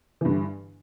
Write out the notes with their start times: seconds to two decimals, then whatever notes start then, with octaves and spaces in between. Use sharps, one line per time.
0.21 E3
0.25 G2
0.29 D3